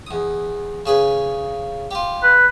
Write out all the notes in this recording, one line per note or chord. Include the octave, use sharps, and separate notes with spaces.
E2 D#6
C#3 G#4 B4
F4 G4
B4